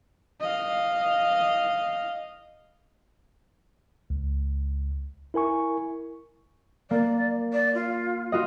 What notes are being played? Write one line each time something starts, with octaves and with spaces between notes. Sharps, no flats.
D#5 F5
C#2
E4 A#4 G#5 C#6
A#3 D5
D5
F4
F4 F#4 D#5